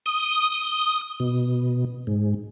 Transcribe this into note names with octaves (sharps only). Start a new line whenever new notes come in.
D#6
B2
G#2